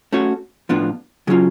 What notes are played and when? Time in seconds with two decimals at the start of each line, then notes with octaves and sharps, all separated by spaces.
0.12 A3 C#4 F#4 C#5
0.69 A2 F3 B3 D4 F4
1.27 C#3 F#3 C#4 F4